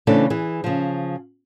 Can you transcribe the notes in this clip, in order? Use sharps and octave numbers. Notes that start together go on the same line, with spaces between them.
C#3 E3 A3 C4 D4 A4
E3 G#4
C#3 F3